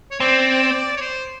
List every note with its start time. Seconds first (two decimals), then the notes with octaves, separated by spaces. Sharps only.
0.11 C#5
0.20 C4 D5
0.97 C#5
1.01 C5